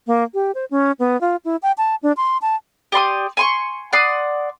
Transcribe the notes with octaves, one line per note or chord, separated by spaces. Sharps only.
A#3
G4
C5
C#4
B3
F4
E4
G5
A5
D4
C6
A5
G4 D5 C6 D#6
G#5 C6 C#6
D5 F#5 C6 D#6